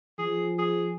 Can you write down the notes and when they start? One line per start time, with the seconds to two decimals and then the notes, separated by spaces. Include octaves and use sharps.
0.19 F3 G#4
0.59 G#4